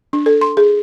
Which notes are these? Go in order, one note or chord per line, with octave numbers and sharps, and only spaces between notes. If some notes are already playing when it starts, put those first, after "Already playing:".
D4
A4
C6
G#4